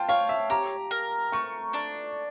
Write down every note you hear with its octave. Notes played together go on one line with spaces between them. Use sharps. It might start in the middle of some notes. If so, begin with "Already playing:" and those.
Already playing: F4 G5 A5
C#5 F5
E5
G4 A#5
A#4
A3 C#6
D4